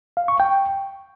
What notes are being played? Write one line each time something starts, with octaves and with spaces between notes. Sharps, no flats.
F5
C#6
G5